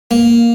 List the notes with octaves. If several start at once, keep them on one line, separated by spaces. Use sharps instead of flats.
A#3